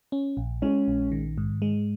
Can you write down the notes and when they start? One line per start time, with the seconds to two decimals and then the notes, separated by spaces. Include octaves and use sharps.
0.12 C#4
0.37 A#1
0.62 G#3 C#4
0.88 A#1
1.12 D#3
1.38 G#2
1.62 G#3